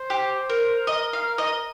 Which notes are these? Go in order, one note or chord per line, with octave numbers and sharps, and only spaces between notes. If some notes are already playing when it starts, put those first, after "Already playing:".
Already playing: C5
G4
A#4
A#4 D#5
F5
D#5